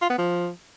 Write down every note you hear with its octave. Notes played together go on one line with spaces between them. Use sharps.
F4
B3
F3